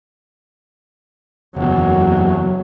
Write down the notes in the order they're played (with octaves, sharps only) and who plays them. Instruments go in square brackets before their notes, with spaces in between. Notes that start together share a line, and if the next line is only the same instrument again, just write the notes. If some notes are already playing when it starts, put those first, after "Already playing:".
[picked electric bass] F#1 E2 [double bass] F#3